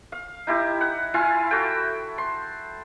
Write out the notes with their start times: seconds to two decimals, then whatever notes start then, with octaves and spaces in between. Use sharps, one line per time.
0.12 F5
0.47 D#4 E4 G4
0.81 F#5
1.14 E4 F4 F5 G#5
1.51 F#4 A4 G5
2.18 C6